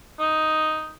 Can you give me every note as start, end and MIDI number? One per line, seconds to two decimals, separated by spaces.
0.20 0.94 63